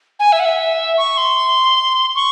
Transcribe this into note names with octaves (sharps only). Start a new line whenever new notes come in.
G#5
E5
F#5
E5
C#6
C6
C#6